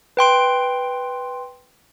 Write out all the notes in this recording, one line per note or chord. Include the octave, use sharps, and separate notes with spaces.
B4 G5 C6 D7